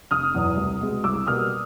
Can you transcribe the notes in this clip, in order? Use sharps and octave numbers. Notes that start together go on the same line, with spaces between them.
F1 D#6 F6
E2 B2 F#3
C2
B2 G#3
C2 D6 E6
B2 G3 A#3 D#6 F6